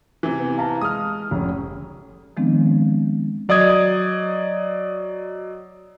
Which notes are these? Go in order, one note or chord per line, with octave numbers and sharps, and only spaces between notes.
C3 E3
B3
F5 A5 A#5
G#3 D#6 F6
F1 C#4
D#3 F3 G#3 B3 C4 D4
F#3 D5 D#5 D#6 G#6